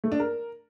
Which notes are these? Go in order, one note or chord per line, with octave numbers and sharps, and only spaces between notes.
A3
D4
A#4